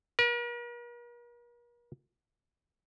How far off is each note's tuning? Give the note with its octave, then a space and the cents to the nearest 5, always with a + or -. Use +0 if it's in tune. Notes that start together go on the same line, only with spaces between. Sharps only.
A#4 +45